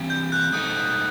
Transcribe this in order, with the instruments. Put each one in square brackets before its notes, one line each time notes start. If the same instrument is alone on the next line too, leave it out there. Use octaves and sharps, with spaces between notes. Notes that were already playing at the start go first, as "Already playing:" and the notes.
Already playing: [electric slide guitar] E3 G3 C4
[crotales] G6
F#6
[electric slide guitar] G3 D#4 A4 C5 D#5 [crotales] D#6